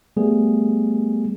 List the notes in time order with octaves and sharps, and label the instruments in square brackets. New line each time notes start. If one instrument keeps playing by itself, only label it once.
[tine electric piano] G3 A3 B3 G#4